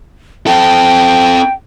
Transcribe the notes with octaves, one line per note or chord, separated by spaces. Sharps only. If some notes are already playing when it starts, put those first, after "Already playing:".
C4 A4 G5